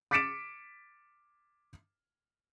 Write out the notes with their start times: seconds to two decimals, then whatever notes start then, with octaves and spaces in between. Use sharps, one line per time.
0.11 D6 A6 B6 C#7 D7 E7